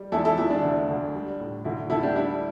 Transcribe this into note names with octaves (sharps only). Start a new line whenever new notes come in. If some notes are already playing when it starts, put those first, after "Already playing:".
Already playing: G3
E2 E4 A4
E4 A4
E2 E4
D4
D2
D2
G3
A2
D2 E4
D2 E4 A4
D4 G4
G3 E4